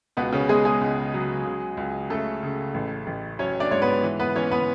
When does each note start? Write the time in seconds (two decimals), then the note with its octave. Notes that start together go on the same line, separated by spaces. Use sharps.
0.17 C#2 B2 B3
0.32 C#3 C#4
0.49 B2 G#3 G#4
0.65 G#3 G#4
0.81 C#2
1.14 F#3
1.45 C#3
1.77 C#2
2.10 C#3 A3 A4
2.43 C#3
2.74 A1
3.07 A1
3.39 F#3 C#4 C#5
3.60 D4 D5
3.71 G#2 C#5
3.82 B3 B4
4.03 E3
4.20 B3 B4
4.35 E3 C#4 C#5
4.51 B3 B4